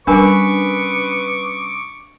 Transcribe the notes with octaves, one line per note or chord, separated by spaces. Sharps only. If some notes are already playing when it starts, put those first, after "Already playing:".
G3 C#4 D4 A#4 B4 G#5 C#6 D6